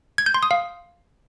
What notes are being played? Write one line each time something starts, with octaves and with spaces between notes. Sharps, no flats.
G#6
G6
C6
D#6
F5